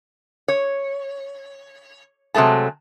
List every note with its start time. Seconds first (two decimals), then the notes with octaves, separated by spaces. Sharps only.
0.48 C#5
2.34 C3 F#3 G#3 A3 A5